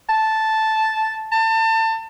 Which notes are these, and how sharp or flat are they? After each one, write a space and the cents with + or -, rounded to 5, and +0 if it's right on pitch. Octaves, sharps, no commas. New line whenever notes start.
A5 -5
A5 +30